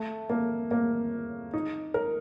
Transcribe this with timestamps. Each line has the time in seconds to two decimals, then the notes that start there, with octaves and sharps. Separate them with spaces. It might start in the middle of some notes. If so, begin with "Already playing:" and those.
Already playing: A3
0.30 A#3
0.71 A#3
1.54 D#4
1.94 A#4